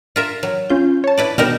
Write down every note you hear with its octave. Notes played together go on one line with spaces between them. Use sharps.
F4 A#4 E5
F#3
C#4 F4 G6
C#5 A5
E4 B4 D5
B2 G3 D#4 A#4 A#6 E7